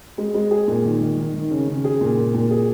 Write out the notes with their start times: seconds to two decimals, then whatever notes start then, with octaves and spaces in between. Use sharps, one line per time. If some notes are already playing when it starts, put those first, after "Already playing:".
0.18 G#3
0.34 G#3
0.51 G#4
0.68 A#2
0.85 D#3
1.01 D#3
1.17 D#3
1.34 D#3
1.51 C#3
1.68 C#3
1.84 G#4
2.01 A#2
2.17 A#2
2.34 A#2
2.51 G#4